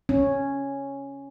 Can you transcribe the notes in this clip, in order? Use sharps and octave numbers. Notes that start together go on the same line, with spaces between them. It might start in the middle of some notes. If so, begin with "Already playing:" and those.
C#4